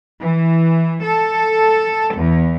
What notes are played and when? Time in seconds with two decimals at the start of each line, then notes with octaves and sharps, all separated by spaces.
0.20 E3
1.02 A4
2.16 E2